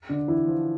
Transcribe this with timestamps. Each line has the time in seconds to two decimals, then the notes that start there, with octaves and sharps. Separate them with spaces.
0.09 D3 D4
0.28 E3 E4
0.46 F3 F4